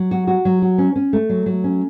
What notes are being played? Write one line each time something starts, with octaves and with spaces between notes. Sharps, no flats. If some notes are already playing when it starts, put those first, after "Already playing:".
Already playing: F#3
F#4
F#4
F#3
F#4
C#4
C#4
A3
F#3
F#3
C#4